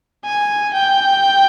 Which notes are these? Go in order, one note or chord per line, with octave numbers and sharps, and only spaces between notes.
G#5
G5